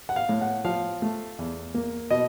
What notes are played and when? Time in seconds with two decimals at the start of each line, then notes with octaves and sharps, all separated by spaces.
0.09 F#5
0.16 F5
0.29 A2
0.41 F#5
0.65 F3 F5
1.02 A3
1.39 E2
1.75 A#3
2.11 B2 D#5